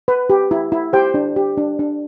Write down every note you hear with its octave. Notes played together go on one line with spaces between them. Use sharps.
B4
G4
E4
E4
G4 C5 G5
D4
G4
D4
D4